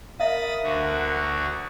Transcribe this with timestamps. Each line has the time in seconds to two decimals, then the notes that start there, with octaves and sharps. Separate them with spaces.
0.20 A#4 E5 F5 B5 D#6 A6
0.63 D2 D3 F#4